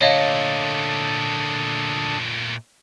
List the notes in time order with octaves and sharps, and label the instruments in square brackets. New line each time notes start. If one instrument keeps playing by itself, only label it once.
[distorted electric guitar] A#2 A3 [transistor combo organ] D3 A4 D#6 [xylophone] C#5 D#5 F5